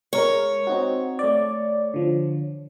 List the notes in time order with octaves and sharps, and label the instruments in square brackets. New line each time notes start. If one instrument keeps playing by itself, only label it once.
[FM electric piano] G#3 A#4 [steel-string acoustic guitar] C#5
[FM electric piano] C4 D#4 F#4
A3 D5
D3 F3